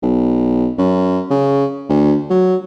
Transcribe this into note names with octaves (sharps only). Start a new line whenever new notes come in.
B1
F#2
C#3
D2
F#3